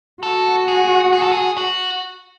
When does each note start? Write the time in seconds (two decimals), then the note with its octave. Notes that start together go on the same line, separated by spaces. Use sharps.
0.23 F#4 A4
0.68 G#4
1.13 G#4
1.22 A4
1.32 G#4
1.58 F#4